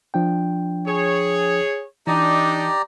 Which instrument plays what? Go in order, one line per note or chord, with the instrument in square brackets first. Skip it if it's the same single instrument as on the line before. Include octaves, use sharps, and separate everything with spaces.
[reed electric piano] F3 D4 G5
[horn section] G#4 C#5
[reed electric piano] E3 [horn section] D4 D#4 [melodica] G4 D5 A#5